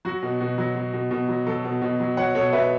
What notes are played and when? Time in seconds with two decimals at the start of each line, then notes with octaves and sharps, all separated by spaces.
0.05 F#3 F#4
0.23 B2
0.41 B2
0.58 F#3
0.75 F#3
0.93 B2
1.11 B2
1.28 F#3
1.47 F#3 A4
1.64 B2
1.82 B2
2.00 F#3
2.17 F#3 C#5 F#5
2.35 B2 A4 C#5
2.52 B2 B4 E5